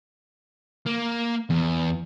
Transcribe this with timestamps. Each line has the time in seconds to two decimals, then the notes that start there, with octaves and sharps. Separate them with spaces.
0.86 A#3
1.50 E2